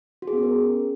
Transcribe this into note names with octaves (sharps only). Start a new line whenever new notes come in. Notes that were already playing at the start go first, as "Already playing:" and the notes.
F#4
G#4
B3
C#4
A#4